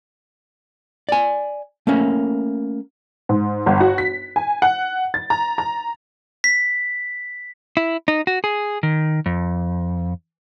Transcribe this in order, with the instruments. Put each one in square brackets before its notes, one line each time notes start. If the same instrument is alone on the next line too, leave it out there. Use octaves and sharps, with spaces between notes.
[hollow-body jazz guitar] D5 G#5
A3 A#3 C#4
[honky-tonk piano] G#2
G1
F#4
B6
G#5
F#5
A6
A#5
A#5
[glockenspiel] B6
[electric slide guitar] E4
D#4
F#4
G#4
D#3
F2